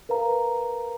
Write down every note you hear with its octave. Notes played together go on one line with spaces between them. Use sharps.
A#4 B4 F5 A#5